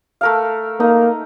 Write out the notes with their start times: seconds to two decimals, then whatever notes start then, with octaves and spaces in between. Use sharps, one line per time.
0.21 A3 A#4 F5
0.80 A#3 D#4